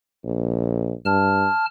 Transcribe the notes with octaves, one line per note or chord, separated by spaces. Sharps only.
A#1
G2 A5 F6